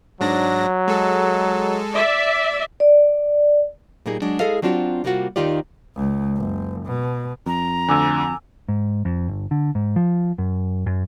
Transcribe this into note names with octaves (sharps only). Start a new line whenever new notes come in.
G#2 F#3 D4 A#6
G#3 A4
D5 E5
D5
A#2 G3 A#3 D#4 G#4
F#3 G#3 D4
G#3 E4 G#4 A4 D#5 F5
F#3 C4 D4 F4 F#4
C3 G3 A#3 F4 F#4
D#2 D#3 D#4 F4 G4 D5
C#2
F#1
B2
F2 A#5
D2 D3 G#5 D6 E6
G#2
F2
G1
D3
G#2
F3
F#2
F#2